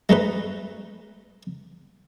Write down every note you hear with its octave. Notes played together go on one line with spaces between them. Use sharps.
G#3 A3 D#4 B4